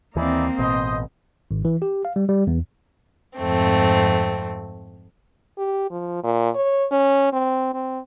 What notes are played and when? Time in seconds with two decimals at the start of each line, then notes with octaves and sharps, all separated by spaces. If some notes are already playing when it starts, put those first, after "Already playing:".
0.16 D#2 E3 A#3 C4 D#4 E4 D5
0.59 A1 B2 C5 D#5
1.51 G#1
1.65 E3
1.82 G4
2.05 F5
2.16 G3
2.29 G3
2.47 E2
3.38 F2 G#2 A3 C4
5.58 G4
5.91 F3
6.24 A#2
6.55 C#5
6.91 C#4
7.33 C4
7.74 C4